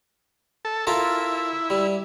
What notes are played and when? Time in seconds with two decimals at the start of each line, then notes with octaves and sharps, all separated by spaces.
0.65 A4
0.87 E4 F4 A4 A#4
1.70 G3